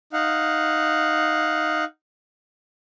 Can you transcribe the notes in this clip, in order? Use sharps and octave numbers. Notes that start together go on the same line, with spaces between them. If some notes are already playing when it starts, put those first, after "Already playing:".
D#4 F5 F#5